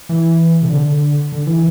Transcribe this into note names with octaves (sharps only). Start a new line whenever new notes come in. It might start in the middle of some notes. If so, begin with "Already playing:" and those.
E3
C3
D3
D3
E3